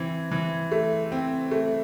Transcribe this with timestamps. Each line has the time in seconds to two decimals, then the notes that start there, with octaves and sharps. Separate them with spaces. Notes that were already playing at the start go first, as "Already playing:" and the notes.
Already playing: E3 C4
0.31 E3
0.72 A3
1.12 C4
1.51 A3